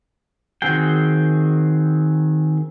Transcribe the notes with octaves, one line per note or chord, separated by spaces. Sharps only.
D#3 C4 F#4 G#4 G5